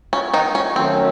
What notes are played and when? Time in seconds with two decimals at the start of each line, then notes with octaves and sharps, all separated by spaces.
0.13 C#4
0.34 D#3 D#4
0.55 C#4
0.76 D#3 F#3 A3 C4 C#4